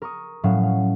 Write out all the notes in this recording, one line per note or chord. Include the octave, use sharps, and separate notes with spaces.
A#4 C#6 D#6
A2 F#3 C#4 F5
F5